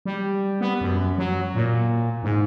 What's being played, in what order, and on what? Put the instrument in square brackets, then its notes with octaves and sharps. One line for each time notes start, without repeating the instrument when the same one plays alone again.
[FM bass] G3
B3
F#2
F#3
A#2
G#2